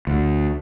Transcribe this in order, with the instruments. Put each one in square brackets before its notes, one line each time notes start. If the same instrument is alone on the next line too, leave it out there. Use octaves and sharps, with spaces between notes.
[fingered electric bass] D2